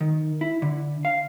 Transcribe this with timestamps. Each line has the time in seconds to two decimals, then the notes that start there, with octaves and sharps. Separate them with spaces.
0.01 D#3
0.41 E4
0.62 D3
1.05 F5